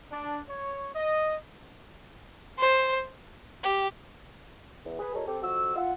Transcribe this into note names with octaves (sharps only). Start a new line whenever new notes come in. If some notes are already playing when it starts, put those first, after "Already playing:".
D4
C#5
D#5
C5
G4
E2
G#4 B4
F3 G3 G#3 A4 A#4 C#5
C4 G4 A4
F2 F#4 E6
F4 E5 F#5